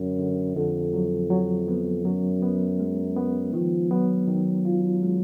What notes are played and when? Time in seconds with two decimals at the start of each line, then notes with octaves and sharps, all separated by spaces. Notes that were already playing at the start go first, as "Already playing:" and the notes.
Already playing: F#2 D3
0.19 D3
0.56 F2 D3
0.93 F#3
1.30 F#3
1.68 B3
2.05 F#2 F#3
2.43 B3
2.80 G#3
3.17 B3
3.53 D#3 F3
3.91 F#3 B3
4.28 D#3
4.65 F4
5.02 G#3